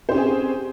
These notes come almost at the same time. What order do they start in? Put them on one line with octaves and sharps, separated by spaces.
C5 G4 C#4 G#4 C4